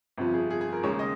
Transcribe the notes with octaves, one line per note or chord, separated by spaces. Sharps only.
G1 F2 C3 F3
G#4
G#4
G#4
A#4
D#2 C#3 G#3 C#5
D#5